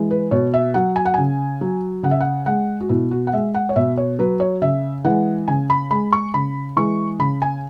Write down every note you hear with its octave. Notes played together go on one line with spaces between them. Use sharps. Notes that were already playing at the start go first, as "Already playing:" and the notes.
Already playing: E3 G#3
B4
B2 C#5
E5
F#3 F#5
G#5
F#5
C#3 G#5
F#3
C#3 F#5
E5
F#5
G#3 F#5
F#4
B2 E4
F#4
F#5
G#3 E5
F#5
C#5
B2 E5
C#5
F#3 B4
C#5
C#3 E5
E3 G#3 F#5
C#3 G#5
B5
G#3 B5
C#6
C#3 B5
E3 G#3 C#6
C#3 B5
G#5